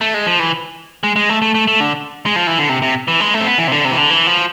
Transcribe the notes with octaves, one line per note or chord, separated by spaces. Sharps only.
A3
G#3
F3
E3
G#3
G#3
A3
A3
A3
A3
D3
G#3
F3
E3
D3
C3
C3
E3
G#3
A3
C4
B3
E3
C3
D3
C3
E3
D3
E3
F3